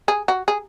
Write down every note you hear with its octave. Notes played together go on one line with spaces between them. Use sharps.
G#4
F#4
G#4